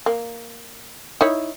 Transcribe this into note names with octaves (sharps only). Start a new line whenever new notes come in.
A#3
D#4 E4 C#5